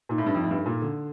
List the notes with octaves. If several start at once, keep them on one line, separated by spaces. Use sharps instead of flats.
A#2 D#4
A2
G2
F2 D#4
A2
G2
A4
A#2
D3 A4